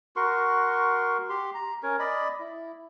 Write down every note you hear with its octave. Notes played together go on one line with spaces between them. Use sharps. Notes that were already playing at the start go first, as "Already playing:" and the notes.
F#4 A#4 C6 C#6
G4 C6
A#5
C#4 A#4 G#5
D5 D#5 B5
E4